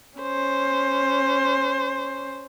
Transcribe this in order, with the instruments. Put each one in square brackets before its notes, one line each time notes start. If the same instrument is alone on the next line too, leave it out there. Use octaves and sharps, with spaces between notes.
[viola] C#4 C5